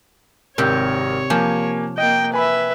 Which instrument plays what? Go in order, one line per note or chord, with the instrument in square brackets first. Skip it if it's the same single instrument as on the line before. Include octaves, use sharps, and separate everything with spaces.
[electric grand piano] G#1 A#4 [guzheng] C3 G4 [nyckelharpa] C#5
[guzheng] F3 [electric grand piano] A#3 G4 G#5
[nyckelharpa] A#3 G5 [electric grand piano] D#5
[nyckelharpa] B4 E5 [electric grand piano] G#5 B5